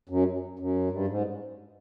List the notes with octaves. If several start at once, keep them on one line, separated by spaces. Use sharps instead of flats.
F#2
F#2
G2
G#2